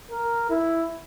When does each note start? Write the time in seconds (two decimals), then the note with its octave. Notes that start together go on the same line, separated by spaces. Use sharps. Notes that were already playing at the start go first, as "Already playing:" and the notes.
0.11 A#4
0.50 E4